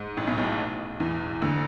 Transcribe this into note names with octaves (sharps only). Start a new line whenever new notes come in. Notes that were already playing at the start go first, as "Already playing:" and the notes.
Already playing: G#2
A1 A2
B1 B2
B1 B2
E2 E3
D2 D3